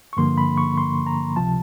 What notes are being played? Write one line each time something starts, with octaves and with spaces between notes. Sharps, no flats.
C#6
G2 D3 F3 A#3 C6
B5
C#6
C6
A#5
C#2 C3 F3 A5